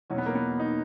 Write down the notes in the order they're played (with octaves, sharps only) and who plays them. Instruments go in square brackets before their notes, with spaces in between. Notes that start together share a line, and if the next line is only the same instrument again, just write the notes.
[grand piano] E2 B2 F#3 C#4
B3
A#3
B3
D#4